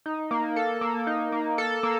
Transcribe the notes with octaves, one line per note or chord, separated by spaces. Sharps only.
D#4
A#3
A4
A#3
D#4
A#3
A4
A#3